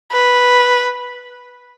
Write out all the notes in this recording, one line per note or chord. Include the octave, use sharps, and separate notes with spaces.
B4